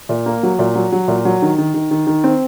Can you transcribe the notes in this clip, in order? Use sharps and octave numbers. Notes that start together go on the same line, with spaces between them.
A#2
A#3
F#3
A#2
F#3
F#3
A#2
F#3
D#3
D#3
D#3
D#3
D#3
C4